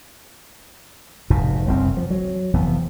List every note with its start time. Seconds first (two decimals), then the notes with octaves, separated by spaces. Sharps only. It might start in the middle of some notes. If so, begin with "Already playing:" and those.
1.30 F1 G#2 B2
1.67 F#1 C2 F#2 C4
1.97 F3
2.10 F#3
2.53 F1 E3 B3